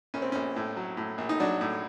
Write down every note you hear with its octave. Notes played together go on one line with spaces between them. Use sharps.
A#1 C#4
C4
A#1 C#4
A2
F#3
A2
A#1
D#4
F#3 D4
A2